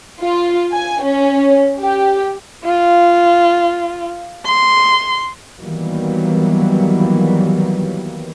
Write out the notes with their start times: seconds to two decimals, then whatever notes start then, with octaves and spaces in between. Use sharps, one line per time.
0.20 F4
0.72 G#5
1.03 C#4
1.81 G4
2.65 F4
4.46 C6
5.61 D#3 E3 F#3 G3 A#3 B3